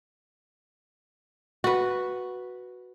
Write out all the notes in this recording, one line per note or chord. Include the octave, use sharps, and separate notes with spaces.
F#4 B4